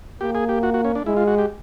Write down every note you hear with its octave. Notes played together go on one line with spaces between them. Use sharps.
A#3 G4
G#4
G4
F#4
F#4
C#4
D4
G#3 E4
F4
F#4
G4